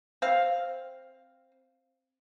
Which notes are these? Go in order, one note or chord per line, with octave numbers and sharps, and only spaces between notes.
C4 F5